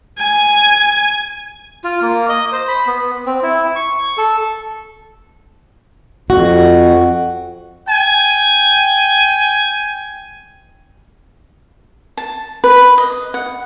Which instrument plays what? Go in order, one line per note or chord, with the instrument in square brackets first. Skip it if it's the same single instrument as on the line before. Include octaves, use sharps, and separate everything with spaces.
[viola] G#5
[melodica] F4
A#3
D#5
C5
B5
B3
C4
E4
C#6
A4
[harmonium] F2 [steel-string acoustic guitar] F#4
[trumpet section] G5 G#5
[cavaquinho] A5
B4
D#5
F#5